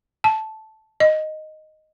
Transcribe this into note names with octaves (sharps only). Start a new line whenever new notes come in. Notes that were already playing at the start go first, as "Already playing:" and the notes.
A5
D#5